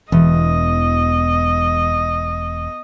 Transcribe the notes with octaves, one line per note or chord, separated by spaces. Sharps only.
E1 E2 D#5